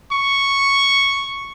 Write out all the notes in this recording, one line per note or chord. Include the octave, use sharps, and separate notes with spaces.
C#6